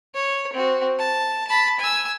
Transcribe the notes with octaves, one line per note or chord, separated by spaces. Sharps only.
C#5
C4 F#4
A5
A5 B5
G#5 E6